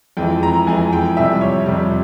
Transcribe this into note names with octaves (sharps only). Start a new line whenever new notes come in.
F2 E3 G#3 G5
A#5
F2 E3 G#3 G#5
G5
F2 C3 G3 E5
C#5
F2 C3 G3